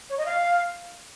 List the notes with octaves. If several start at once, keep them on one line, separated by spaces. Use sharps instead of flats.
C#5
D#5
F5